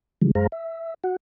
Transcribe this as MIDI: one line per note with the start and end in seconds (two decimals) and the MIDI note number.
0.22 0.31 49
0.22 0.31 52
0.22 0.31 53
0.22 0.31 55
0.22 0.31 56
0.35 0.47 42
0.35 0.47 56
0.35 0.47 68
0.35 0.47 72
0.35 0.47 77
0.35 0.47 82
0.52 0.94 76
1.04 1.16 66
1.04 1.16 78